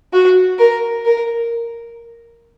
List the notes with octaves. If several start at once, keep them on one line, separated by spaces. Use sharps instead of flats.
F#4
A#4
A#4